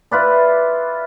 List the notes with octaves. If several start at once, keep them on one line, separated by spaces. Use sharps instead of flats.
E4 F4 B4 D5